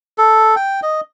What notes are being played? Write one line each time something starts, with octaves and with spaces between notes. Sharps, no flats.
A4
G5
D#5